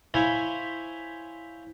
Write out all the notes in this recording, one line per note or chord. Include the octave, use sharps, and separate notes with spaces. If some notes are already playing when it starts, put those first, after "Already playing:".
E4 C5 C#5 E5 F5 G#5